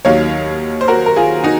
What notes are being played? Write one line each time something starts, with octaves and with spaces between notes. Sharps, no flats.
D#2 D#3 F#3 C#5 F5
C5
F#4 A#4
A#4
F4 G#4
D#4 F#4